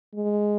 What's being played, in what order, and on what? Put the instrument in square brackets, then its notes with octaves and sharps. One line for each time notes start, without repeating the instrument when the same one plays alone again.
[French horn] G#3